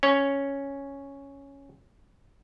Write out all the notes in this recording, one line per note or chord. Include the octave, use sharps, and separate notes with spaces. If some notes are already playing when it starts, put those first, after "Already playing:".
C#4 C#5